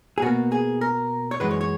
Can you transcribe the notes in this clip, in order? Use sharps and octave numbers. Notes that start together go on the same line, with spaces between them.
G#4
B2 A#3 F#4
G#4
A#4
C#5
F#2 E3 G#3 B4
C#5
C#5